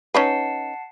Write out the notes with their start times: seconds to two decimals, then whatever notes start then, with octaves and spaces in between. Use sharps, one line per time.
0.14 C#4 D#4 B4 F#5 A5 C7